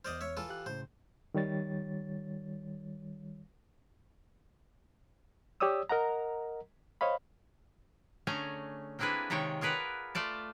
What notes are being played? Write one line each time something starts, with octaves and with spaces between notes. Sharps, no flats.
E2 C5 D5 D#5 F6
C#5 E5
E3 F4 A4
G4 F5 F#6
A2 C#3 C5
D#3 G3 C#5 A6
G4 C#5 D5 D#6 E6
A#4 D#5 F#5 A#5
C5 C#5 D#5 F5 B5
D3 A3 C#4 G#4 G#5 A#5
A#3 C4 D4 E4 G#4 B4
C3 D#3 G#3 C#5 G5
F4 G#4 A#4 B4 D5 F#5
A3 F4 D5 A5